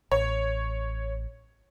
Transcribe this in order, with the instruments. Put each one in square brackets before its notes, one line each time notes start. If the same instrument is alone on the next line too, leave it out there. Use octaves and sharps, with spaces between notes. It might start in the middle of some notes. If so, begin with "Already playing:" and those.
[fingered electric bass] A1 [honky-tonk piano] C#5